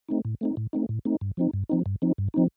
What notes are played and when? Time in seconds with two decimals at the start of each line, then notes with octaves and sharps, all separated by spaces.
0.09 A3 C4 D#4
0.25 A2
0.41 A3 C4 D#4
0.57 A2
0.73 A3 C4 D#4
0.89 A2
1.05 A3 C4 D#4
1.21 G2
1.37 F3 C4 D#4
1.53 G2
1.69 F3 C4 D#4
1.86 G2
2.02 F3 C4 D#4
2.18 G2
2.34 F3 C4 D#4